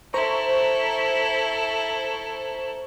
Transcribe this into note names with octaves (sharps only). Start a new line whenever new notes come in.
E4 A4 C5 A#5 C#6